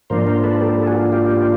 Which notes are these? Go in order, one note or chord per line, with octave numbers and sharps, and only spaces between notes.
G#2 F3 A#3 D4 A#4 C5
A#4 C5
A4 B4
G4 A4
A4
F#4 G#4
F4
F4 G4